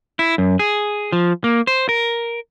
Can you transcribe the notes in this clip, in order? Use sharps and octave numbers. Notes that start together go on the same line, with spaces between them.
E4
F#2
G#4
F3
A#3
C5
A#4